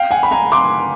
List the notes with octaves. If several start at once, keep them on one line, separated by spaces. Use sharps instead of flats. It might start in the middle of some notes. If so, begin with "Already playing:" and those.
Already playing: F5 G5
F#5 G#5
B5
G#5 A#5
C6 D6